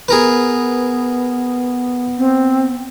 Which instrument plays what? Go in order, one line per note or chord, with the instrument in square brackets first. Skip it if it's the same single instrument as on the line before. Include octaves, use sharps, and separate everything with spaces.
[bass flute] B3 [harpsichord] G#4 A#4 B4
[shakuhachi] C4